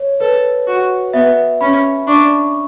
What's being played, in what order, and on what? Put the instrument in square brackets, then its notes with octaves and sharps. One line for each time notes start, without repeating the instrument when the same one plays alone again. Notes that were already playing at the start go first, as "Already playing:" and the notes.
Already playing: [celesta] C#5
[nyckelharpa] A4 [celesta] B4
[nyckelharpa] F#4
[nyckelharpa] B3 [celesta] E5
[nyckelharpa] C#4 [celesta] B5
[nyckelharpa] D4 [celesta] C#6